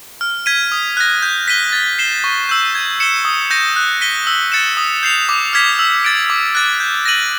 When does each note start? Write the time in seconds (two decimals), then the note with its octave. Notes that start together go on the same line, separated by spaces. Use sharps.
0.21 F6
0.46 G#6 B6 D#7
0.72 D#6
0.97 F#6 A#6
1.22 G6
1.48 B6 D#7 G7
1.73 A6
1.99 C7 E7 G7
2.24 C#6
2.49 E6 G6
2.75 G#6
3.00 C#7 E7 G7
3.25 D#6
3.51 G6 A#6 D#7
3.76 F#6
4.01 B6 D#7 G7
4.27 E6
4.52 A6 C#7 E7
4.77 D#6
5.03 G6 C7 F7
5.29 D6
5.53 F6 G#6 B6
5.79 E6
6.04 A6 D7
6.30 D6
6.55 F#6 A6
6.80 G6
7.05 A#6 D#7 F#7